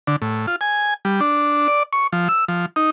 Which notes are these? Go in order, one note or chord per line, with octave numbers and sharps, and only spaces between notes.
D3
A2
F4
G#5
G3
D4
D5
C#6
F3
E6
F3
D#4